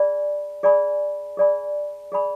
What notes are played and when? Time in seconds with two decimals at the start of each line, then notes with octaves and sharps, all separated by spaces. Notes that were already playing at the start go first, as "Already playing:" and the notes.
Already playing: G#4 D5 G#5 B5
0.63 G#4 D5 G#5 B5
1.37 G#4 D5 G#5 B5
2.12 G#4 D5 G#5 B5